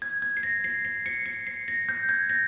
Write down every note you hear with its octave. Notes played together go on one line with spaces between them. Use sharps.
G#6
G#6
C7
A#6
C7
C7
C#7
C#7
C7
A#6
G6
G#6
A#6